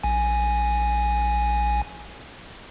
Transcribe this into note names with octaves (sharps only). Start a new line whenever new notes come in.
A#1 G#5